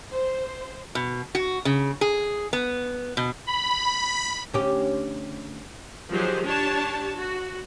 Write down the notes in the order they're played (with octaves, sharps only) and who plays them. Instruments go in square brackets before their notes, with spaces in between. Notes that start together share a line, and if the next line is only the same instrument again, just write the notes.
[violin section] C5
[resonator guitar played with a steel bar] B2
F#4
C#3
G#4
B3
B2
[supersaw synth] B5
[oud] D2 C#4 G4
[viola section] D#3 F3 F#3 G4 G#4 C5
D4 G4 C#5 A5
F#4